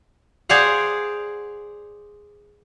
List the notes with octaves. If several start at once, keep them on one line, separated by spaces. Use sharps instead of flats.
G#4 C5 D5 F5 F#5